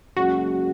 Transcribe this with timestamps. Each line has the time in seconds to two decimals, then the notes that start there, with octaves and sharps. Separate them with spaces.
0.16 F#1 F#2 C#3 G#3 F#4